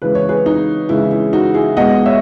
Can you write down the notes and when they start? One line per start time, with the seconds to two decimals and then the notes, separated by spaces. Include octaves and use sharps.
0.02 C#3 E3 G#3 B4
0.15 C#5
0.29 G#4 B4
0.46 D#4
0.89 C#3 E3 G#3 E4
1.11 E4
1.33 D#4 F#4
1.54 E4 G#4
1.77 B2 G#3 D#5 F#5
2.06 C#5 E5